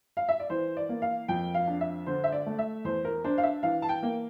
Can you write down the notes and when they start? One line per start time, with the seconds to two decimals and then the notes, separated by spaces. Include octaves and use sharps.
0.17 F5
0.29 E5
0.40 D5
0.50 E3 C5
0.77 D5
0.89 A#3
1.02 F5
1.28 F2 G5
1.54 F5
1.68 D4
1.81 E5
2.06 D3 C5
2.24 E5
2.32 D5
2.46 A3
2.59 E5
2.85 E2 C5
3.05 A#4
3.24 D4 C5
3.38 F5
3.43 E5
3.63 E3 F5
3.82 A5
3.89 G5
4.03 A#3